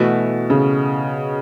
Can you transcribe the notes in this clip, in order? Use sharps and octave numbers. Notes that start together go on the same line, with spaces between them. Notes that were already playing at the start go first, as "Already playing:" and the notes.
Already playing: B2 E3 A3 F#4
C#3